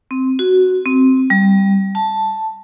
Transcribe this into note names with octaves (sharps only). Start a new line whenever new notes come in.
C4
F#4
C4
G3
A5